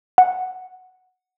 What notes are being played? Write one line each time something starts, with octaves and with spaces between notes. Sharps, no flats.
F#5